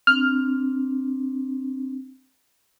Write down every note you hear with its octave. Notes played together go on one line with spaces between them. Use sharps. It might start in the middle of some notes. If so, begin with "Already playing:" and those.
C4 D4 F6